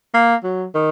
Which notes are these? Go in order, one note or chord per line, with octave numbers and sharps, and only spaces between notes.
A#3
F#3
D#3